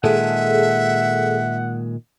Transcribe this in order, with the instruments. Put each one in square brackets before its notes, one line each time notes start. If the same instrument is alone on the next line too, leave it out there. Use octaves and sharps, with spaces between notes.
[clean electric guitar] A#2 D#3 G#3 [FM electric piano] G#4 A4 [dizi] E5 [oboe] F#5